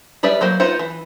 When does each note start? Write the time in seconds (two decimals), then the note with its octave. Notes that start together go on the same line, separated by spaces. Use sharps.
0.23 G3 G#4 B4 D5 E5
0.41 F#3 A#3 C5
0.60 B3 D#4 F4 C5 F#5
0.79 E3